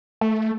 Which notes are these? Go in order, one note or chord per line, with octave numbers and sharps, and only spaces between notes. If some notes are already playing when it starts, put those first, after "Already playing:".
A3